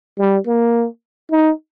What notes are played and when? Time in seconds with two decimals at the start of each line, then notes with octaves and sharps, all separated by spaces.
0.19 G3
0.46 A#3
1.31 D#4